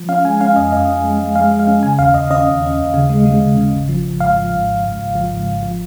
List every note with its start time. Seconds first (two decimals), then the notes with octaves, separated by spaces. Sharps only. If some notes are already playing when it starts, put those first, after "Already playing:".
Already playing: F3
0.09 C#4 F5
0.24 G#3 G#5
0.41 C#4 F5
0.56 F2 D#5
0.72 F2 D#5
0.88 C#4
1.04 G#3
1.19 G#3
1.36 G#3 F5
1.51 G#3
1.59 F5
1.67 C#4
1.83 C#3 G#5
1.99 D#2 F5
2.14 D#2 D#5
2.30 C#4 D#5
2.46 D#2
2.62 C#4
2.78 D#2
2.94 C#3
3.10 G#3
3.26 G#3
3.41 C#3
3.57 C#3
3.73 G#1
3.89 F3
4.05 G#1
4.20 G#2 F5
4.36 F3
4.51 G#2
4.68 G#1
4.84 G#2
4.99 G#1
5.15 F3
5.31 G#2
5.47 G#1
5.63 F3